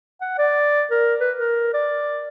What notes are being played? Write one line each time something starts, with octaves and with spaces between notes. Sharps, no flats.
F#5
D5
A#4
B4
A#4
D5